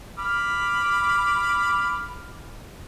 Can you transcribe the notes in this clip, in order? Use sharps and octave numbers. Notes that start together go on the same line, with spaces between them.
B5 D6 F6